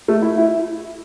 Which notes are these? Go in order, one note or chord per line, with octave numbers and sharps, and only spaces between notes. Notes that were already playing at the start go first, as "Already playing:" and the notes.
A3
E4
E4